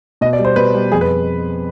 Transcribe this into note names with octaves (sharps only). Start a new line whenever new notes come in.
B2 D#5
D5
G3
C5
B2 B4
G3
F2 G#4
B4